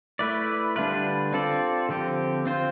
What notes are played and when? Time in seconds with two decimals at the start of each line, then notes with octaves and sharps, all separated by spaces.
0.19 A3 E4 B4 D5
0.76 D3 G3 D4 F4 B4
1.33 C4 F4 A4 D5
1.89 D3 F3 C4 G4
2.46 C4 F4 C5